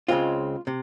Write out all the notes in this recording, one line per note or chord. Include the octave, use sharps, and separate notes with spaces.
C#2 C#3 G#3 C4 F4
C3